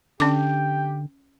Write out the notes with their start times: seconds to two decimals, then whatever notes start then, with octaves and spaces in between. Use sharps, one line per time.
0.20 D3 C#4 G4 G5 D6